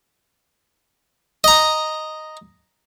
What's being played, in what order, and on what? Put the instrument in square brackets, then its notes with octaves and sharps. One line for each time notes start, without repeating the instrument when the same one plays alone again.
[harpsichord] D#5 A#5